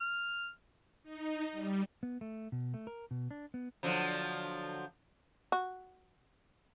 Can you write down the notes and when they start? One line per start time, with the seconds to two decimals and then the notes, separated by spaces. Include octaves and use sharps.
0.01 F6
1.03 D#4
1.52 G3
2.03 B3
2.21 A3
2.52 B2
2.74 A3
2.87 A#4
3.11 B2
3.31 D4
3.54 B3
3.83 D3 F3 F#3
5.52 F#4